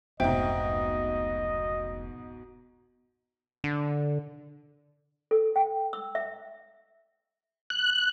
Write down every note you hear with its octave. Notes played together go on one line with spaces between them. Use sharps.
F1 C#2 G#2 B2 C5 D#5 E5 G5
D3
A4
G5
E6
E5
F#6